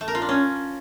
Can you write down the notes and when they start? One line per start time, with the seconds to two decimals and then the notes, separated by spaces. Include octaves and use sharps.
0.01 A3
0.08 A#4
0.15 F4
0.22 D4
0.29 C#4